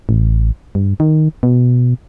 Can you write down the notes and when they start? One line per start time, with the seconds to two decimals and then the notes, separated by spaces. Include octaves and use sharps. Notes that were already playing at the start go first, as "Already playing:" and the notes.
0.09 A1
0.75 G2
1.00 D#3
1.43 B2